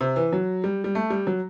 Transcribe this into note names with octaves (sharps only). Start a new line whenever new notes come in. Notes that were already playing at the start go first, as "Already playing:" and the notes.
C3
E3
F#3
G3
G3
A3
G3
F#3